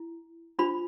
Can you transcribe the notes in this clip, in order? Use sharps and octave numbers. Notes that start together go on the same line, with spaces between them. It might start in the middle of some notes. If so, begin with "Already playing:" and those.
Already playing: E4
D4 F4 C5 B5